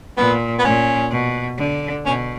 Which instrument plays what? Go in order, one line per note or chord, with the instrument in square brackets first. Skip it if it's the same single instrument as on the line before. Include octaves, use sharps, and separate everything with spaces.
[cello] A#2 [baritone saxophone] B3
[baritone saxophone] B3
[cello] A#2 [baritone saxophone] C#4
[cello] B2
D3
[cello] B2 [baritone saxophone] C#4